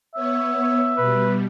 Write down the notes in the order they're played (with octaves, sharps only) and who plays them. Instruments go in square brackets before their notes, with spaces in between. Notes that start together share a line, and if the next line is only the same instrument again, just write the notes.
[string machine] B3 C#5 [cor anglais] E5
[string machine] B2 G3 [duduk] B4